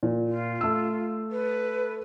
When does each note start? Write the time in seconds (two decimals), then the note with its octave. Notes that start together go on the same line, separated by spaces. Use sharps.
0.03 A#2
0.28 F4
0.61 A3 E6
1.32 B4